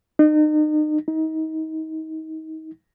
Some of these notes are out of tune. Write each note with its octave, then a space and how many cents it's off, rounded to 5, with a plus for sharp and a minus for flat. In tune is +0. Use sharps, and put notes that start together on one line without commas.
D#4 -35
D#4 +30